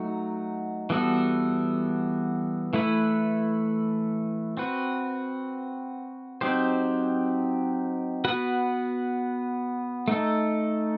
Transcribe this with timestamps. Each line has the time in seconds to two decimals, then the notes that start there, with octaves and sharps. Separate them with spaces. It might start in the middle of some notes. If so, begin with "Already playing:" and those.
Already playing: F#3 A3 D#4 F#4
0.90 E3 G3 B3 F#4 A4
2.73 E3 A3 E4 B4
4.57 C4 F#4 B4
6.41 F#3 C4 D#4 G4 C5
8.24 B3 F#4 B4
10.08 A3 D#4 A4